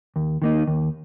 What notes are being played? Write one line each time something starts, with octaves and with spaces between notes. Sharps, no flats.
D#2
D#3 A#3 D#4
D#2